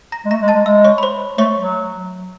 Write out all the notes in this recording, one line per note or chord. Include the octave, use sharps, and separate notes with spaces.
A#5 A#6
G#3
A3 A#5 A#6
G#3
A5 A6
G#3
G#3 E5 E6
C#5 C#6
B5
C5 C6
A3 C#5 C#6
F#3